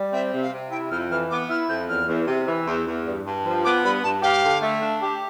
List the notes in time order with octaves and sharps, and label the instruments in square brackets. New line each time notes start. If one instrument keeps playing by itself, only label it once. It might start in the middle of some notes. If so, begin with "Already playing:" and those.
Already playing: [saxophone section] G3
[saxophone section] C4 [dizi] E5
[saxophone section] C3
[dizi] F5
[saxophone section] C3
[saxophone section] E4 [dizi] G5
[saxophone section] F2 [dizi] F6
[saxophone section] E3 [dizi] F6
[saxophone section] B3 [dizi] D6
[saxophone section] E4 [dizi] F6
[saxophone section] F2 [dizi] G6
[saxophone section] E2 [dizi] F6
[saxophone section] E2
C3
[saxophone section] E3 [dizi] E6
[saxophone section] E2
E2
G2
G2
F3
[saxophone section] B3 [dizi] D6
[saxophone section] G2 [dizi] B5
[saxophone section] G2 [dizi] A5
[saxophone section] G4 [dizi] F5
[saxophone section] D3
A3
D4
G4